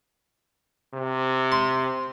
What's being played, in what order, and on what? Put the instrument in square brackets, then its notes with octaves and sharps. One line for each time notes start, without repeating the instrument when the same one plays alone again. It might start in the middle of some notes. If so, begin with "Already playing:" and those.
[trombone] C3
[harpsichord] C6